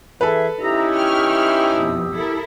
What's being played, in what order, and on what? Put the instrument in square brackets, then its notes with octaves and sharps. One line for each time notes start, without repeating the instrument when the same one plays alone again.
[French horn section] E3 [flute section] G#4 E5 [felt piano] A4 B4
[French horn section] C#4 D#4 E4 [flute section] G4 D#6 E6 [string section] A#5
[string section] G5 C#6 F6
F2 B2
E4 A4 A#4